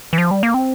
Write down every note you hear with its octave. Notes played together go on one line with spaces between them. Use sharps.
E3
F3
G3
A#3
C4